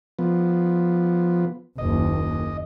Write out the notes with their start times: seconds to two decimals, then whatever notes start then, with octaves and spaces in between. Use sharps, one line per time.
0.19 F3 B3
1.78 F#1 D#2 D#5